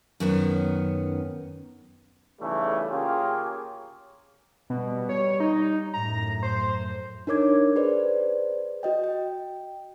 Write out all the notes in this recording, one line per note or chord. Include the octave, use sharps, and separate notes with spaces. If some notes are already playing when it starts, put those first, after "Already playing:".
F#2 D#3 B3 C#4
B1 C#3 E3 G3 A3
C#3 A#3 C#4 F4 G4 G#4
B2 G3
C#5
D#4
F#2 A2 A#5
C5
D4 D#4 A#4 C#5 D6 G#6
G#4 B4 C5 D5
F#4 D#5 G5
G5